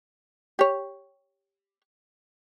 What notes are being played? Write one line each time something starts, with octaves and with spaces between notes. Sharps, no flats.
G4 C#5